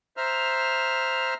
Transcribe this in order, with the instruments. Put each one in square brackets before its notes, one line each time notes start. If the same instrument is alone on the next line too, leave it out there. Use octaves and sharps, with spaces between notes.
[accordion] C5 E5 A#5 F6